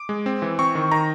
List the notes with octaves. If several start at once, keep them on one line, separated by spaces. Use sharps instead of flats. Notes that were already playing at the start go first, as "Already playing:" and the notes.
Already playing: D6
G#3
C4
E3
C4 C#6
D#3
D#3 A#5